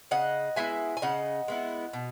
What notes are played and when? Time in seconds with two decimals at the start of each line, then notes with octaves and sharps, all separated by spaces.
0.11 C#3 D#5 F#5
0.56 G#3 B3 E4 E5 G#5
0.97 G#5
1.02 C#3 D#5 F#5
1.48 G#3 B3 E4
1.93 B2